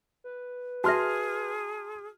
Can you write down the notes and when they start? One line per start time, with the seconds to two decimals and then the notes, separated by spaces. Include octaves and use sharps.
0.24 B4
0.84 F#4 G#4 E5 A5 C6 F6